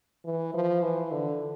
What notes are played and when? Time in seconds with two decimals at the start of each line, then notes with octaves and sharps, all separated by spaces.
0.25 E3
0.54 F3
0.82 E3
1.12 D3